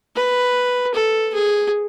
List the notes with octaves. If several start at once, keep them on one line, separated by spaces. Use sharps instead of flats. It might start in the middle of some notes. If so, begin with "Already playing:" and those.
B4
A4
G#4